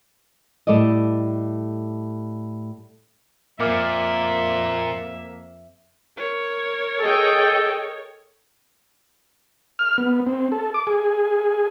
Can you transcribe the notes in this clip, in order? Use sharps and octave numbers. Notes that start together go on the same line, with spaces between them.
A2 G3 A4 D5 D#5
F2 A#2 A#3 E5 D6 F6
A#4 C#5
G#4 A4 D#5 G5
F6
B3
C4
A4
D6
G#4